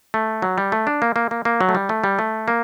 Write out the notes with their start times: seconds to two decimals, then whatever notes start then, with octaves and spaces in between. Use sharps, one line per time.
0.14 A3
0.42 F#3
0.58 G3
0.72 A3
0.87 D4
1.02 A#3
1.16 A#3
1.31 A#3
1.45 A#3
1.61 F#3
1.69 A3
1.75 G3
1.89 A3
2.04 G3
2.19 A3
2.48 A#3